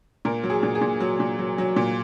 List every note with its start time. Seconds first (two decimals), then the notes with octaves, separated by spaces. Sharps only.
0.25 A#2 A#4
0.43 F#3
0.50 G#4
0.63 A#2
0.75 G#4
0.81 A#2
1.00 F#3
1.20 A#2
1.39 F#3
1.58 F#3
1.76 A#2